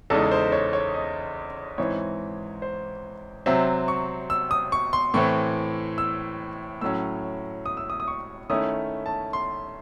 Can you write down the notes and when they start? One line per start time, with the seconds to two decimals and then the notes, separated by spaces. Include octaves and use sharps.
0.10 E2 C#3 G#3 D#4 A4
0.31 C5
0.52 C#5
0.73 C#5
0.94 D#5
1.78 G#2 E3 C4 C#5
2.62 C5
3.46 C3 F#3 C4 E5
3.88 C#6
4.30 E6
4.51 D#6
4.72 C#6
4.93 C6
5.14 A2 E3 C4 C#6
5.98 E6
6.81 A2 F#3 C#4 E6
7.66 D#6
7.77 E6
7.90 D#6
8.00 D#6
8.08 C#6
8.50 D#3 A3 C#4 E4 D#6
9.06 A5
9.33 C6